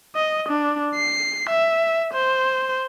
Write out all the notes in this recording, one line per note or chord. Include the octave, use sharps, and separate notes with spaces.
D#5
D4
C7
E5
C5